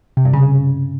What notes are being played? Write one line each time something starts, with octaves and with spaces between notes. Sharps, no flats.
C3
G2
C#3